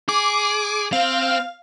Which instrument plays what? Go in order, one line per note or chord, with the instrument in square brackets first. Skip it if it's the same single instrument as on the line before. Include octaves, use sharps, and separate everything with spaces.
[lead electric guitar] G#4 [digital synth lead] D6
[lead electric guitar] C4 C5 [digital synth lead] F5